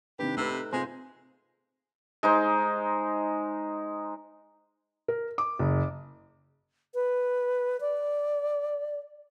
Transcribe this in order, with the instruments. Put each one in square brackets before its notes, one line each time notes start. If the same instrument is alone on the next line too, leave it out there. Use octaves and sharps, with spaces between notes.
[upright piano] C3 D#3 D4 [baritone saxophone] G4 [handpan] B4
[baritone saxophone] C3 [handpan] A3 D#4 B4 [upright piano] E6
[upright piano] C3 G#5 [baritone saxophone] G#3 [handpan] F4 C5
[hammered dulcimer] G#3 D#4 C5
[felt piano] A#4
D6
F#1
[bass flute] B4
D5